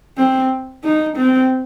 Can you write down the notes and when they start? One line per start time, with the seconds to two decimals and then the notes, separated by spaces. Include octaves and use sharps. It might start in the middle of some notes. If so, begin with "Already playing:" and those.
0.17 C4
0.84 D#4
1.17 C4